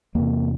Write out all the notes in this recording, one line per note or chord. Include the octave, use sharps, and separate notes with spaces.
E2 C3 A#3